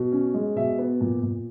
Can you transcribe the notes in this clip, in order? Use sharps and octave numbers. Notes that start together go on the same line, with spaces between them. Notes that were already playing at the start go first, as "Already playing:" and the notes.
Already playing: B2
C#4
G#3
B2 E5
B3
A#2
A#2